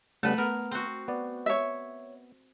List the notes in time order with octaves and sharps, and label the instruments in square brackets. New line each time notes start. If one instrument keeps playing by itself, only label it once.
[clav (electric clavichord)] C#3 G3 B3 [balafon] A3 [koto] A4 B4
[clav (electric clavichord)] B3 [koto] A#4
[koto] C4 F#4
[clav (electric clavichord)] B3 D5
[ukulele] C#5 E5